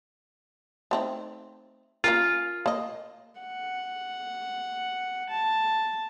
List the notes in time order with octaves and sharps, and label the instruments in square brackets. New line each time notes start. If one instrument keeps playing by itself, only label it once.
[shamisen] A3 C4 D#4
[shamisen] A#3 C#4 A#4 [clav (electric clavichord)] F4
[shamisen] A#3 D#5
[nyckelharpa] F#5
A5